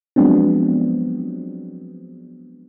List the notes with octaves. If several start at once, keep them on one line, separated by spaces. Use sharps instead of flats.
F3 F#3 G#3 B3 C4 D4